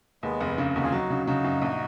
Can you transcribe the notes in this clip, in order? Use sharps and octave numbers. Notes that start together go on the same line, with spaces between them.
D#2 G#3 B3
F1
C#3 A#3
D#2 D#4 F#4
F4 G#4
F#3 D#4 F#4
C#3
C#3 D#4 F#4
F#2
A#1